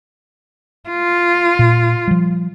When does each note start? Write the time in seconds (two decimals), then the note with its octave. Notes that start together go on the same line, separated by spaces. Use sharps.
0.90 F4
1.59 A#2
2.08 F3 G3